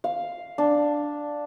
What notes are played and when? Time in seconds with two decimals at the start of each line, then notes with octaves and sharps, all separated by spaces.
0.04 F5
0.58 D4